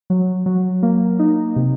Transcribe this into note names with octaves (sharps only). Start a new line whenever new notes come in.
F#3
F#3
A#3
D#4
C3